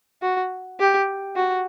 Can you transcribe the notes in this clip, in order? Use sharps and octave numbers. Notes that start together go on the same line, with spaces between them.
F#4
G4
F#4